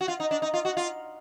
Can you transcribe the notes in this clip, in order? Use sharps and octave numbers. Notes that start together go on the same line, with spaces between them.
F#4
F4
D#4
D4
D#4
F4
F#4
F4